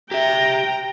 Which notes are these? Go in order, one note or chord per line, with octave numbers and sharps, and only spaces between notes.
G4 E5 G5 A#5